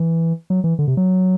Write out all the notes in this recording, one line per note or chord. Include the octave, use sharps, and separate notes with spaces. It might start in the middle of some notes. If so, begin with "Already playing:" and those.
Already playing: E3
F#3
E3
D3
C3
F#3